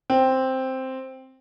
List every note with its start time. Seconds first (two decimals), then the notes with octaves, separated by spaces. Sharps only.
0.10 C4